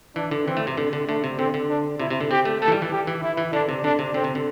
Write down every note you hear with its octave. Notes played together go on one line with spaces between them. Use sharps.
E3 D4
D3
E3 C4
A3
C3
D3
D3
D3 A3
C3
D3 C4
D3
D4
C3 E4
C3
D3
C4 G4
A3
A3 A4
E3
G3
E3
G4
E3
E4
E3
D3 D4
C3
D3 D4
C3
D3 C4
C3
D3